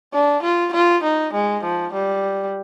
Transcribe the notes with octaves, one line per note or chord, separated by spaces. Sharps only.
D4
F4
F4
D#4
G#3
F3
G3